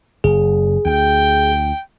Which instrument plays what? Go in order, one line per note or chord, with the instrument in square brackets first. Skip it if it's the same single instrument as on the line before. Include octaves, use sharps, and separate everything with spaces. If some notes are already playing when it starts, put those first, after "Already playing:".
[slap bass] F#1 [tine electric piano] G#4
[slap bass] D2 [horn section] G5